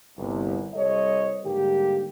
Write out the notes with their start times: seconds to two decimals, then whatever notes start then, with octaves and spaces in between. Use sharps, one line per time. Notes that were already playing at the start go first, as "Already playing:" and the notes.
0.17 G1 C2
0.74 C2 G3 A4 C5 C#5 D#5
1.44 G#2 D3 G3 A#3 G4